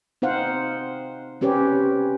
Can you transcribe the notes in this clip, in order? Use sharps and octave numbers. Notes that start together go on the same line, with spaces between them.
C4 D#4 C5 F5 F#5
C4 C#4 G4 B4 C#5